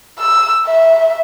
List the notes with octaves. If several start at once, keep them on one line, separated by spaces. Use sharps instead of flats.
E6
E5